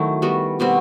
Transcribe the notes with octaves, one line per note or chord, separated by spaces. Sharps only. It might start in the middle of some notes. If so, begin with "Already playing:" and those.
Already playing: D#3 F#3 A3 E4
G3 B3 F#4
B2 G3 C4 F#4